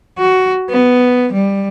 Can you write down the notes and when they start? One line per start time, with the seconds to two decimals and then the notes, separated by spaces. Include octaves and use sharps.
0.19 F#4
0.70 B3
1.32 G3